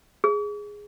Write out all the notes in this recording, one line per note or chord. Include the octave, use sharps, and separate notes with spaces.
G#4